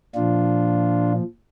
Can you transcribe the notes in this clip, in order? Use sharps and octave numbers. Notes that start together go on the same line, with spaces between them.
A#2 F3 D4 F4